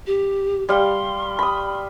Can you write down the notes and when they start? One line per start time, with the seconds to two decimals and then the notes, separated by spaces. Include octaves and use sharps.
0.07 G4
0.69 G3 F5 C6
1.39 B5 D#6